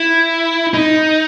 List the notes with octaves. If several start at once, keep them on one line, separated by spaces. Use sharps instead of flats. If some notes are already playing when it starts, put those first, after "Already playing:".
Already playing: E4
D#4